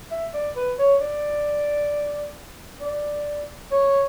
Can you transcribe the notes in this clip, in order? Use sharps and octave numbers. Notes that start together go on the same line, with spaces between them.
E5
D5
B4
C#5
D5
D5
C#5